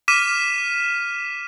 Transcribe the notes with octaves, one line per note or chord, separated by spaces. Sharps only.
D6 F6 B6 D#7 E7